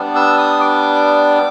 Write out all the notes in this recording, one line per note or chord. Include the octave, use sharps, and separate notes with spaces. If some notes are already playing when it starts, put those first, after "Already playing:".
Already playing: G3 B3 D4
E6
D#6
D6